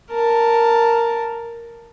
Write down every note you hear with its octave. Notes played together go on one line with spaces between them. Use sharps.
A#4 A5